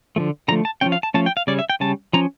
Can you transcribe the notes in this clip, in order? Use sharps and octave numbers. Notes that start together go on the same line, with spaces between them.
D3 F3 A3
D3 F3 A3 A#5
A5
F3 A3 C#4 G5
F5
A5
F3 A3 C#4 A5
G5
F5
C#3 G3 C#4 D5
E5
G5
C#3 G3 C#4 A5
F3 C#4 A#5